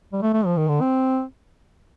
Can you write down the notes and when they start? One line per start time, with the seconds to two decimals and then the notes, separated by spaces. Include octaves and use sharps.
0.13 G3
0.22 A3
0.34 A3
0.46 F3
0.57 D#3
0.68 D3
0.81 C4